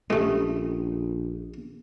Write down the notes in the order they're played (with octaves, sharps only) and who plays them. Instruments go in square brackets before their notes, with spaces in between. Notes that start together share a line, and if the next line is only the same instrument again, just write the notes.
[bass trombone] A#1 [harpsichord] G#3 A3 [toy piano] C#4 G4 A4